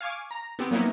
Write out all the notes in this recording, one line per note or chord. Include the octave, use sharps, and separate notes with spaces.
F5 G#5 C#6 D6
A#5
B3 C4 G4
F#3 A#3 B3 C#4 D#4 E4